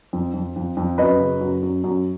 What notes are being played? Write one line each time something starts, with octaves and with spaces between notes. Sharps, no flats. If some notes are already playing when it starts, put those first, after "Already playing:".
F2
F2
F2
F2
F#2 B4 D#5
C#3
F#2
F#2
F#2